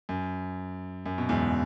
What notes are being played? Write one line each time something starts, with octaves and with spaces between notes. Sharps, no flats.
F#2
F#2
B2
E2 G#2